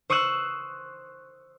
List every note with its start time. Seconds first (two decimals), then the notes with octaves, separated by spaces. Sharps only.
0.10 C5 C#6 D#6 E6 F#6